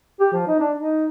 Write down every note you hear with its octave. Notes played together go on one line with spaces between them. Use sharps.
G4
F3
D#4
D4
D#4